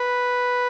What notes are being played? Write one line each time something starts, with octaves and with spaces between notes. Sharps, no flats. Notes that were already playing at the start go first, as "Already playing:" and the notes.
Already playing: B4